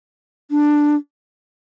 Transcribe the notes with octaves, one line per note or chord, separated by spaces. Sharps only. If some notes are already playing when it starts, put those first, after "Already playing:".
D4